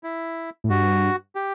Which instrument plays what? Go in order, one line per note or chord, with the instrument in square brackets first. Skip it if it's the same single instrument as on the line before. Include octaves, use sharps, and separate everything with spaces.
[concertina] E4
[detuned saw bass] A2
[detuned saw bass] G2 [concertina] F#4
[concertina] G4